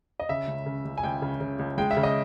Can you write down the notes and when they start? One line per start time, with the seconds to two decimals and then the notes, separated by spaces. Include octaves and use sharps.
0.20 D#5
0.29 C#3 E5
0.47 C#2
0.66 C#3
0.85 C#2
0.98 G#5
1.03 C#2 G5
1.22 C#3
1.40 C#3
1.59 C#2
1.78 G#3 G5
1.91 E5
1.96 C#3
2.03 D#5